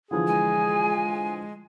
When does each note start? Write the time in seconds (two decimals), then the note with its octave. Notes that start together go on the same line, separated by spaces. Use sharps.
0.11 D3 E3 F3 G#4
0.27 G#3 G#5